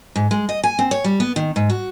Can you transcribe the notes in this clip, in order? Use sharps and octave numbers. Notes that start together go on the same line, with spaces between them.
G#2
G#3
D#5
G#5
C4
C#5
G3
B3
D#3
G#2
F#4